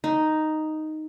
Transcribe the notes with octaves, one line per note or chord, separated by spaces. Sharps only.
D#4